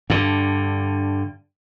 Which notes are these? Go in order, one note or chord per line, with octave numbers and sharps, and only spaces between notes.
G2 D3